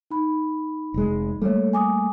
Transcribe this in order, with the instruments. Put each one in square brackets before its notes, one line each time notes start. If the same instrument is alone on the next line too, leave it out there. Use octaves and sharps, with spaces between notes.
[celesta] D#4 B5
[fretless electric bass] F1 G#3
[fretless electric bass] G3 A3 A#3 [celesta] A4 C#5
[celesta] G#5 D6 D#6